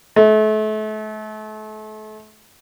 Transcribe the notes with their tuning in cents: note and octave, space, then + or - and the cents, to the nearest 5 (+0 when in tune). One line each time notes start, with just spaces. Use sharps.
A3 -35